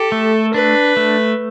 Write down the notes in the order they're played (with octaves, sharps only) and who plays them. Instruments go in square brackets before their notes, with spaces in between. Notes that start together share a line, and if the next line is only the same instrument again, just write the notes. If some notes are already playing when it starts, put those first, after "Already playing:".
Already playing: [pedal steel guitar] G4 [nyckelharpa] A4
[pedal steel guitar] A3
[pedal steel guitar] D4 [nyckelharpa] B4
[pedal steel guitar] A3